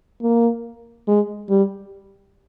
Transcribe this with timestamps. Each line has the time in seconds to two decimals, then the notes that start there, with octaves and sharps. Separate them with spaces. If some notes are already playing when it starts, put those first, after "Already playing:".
0.22 A#3
1.08 G#3
1.50 G3